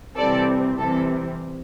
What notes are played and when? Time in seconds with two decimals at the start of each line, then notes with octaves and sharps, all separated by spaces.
0.16 C3 E3 G3 C4 A4 D5
0.77 C3 E3 G3 C4 A4